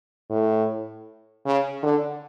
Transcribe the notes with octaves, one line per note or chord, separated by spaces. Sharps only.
A2
C#3
D3